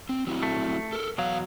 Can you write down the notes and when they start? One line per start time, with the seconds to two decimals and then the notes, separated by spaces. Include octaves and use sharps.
0.09 C4
0.27 F#3 C4 E4
0.43 A3
0.93 A4 A#4
1.18 E2 B2 F#3 F5